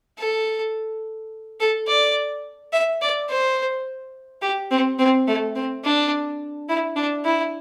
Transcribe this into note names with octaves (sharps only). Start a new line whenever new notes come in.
A4
A4
D5
E5
D5
C5
G4
C4
C4
A3
C4
D4
E4
D4
E4